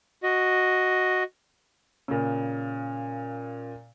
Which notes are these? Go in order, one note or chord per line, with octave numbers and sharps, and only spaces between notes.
F#4 D#5
A#2 C#3